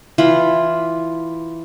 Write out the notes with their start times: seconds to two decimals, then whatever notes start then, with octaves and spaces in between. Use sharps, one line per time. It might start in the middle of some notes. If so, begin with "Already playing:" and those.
0.18 E3 F4 B5